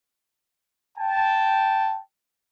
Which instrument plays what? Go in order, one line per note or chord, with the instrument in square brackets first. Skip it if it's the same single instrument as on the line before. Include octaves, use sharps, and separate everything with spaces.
[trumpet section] G5 A5